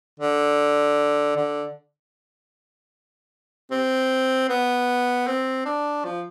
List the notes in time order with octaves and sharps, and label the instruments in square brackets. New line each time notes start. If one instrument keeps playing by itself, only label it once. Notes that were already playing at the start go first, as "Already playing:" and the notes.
[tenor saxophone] D3
D3
C4
B3
C4
D4
F3